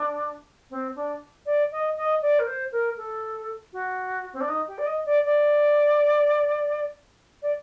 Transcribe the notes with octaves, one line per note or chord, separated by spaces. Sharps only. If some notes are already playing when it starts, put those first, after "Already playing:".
Already playing: D4
C4
D4
D5
D#5
D#5
D5
A#4
C5
A#4
A4
F#4
C4
D4
D#4
G4
D5
D#5
D5
D5
D5